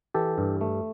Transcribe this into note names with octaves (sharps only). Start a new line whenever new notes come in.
E3 G4 A4
G2
A3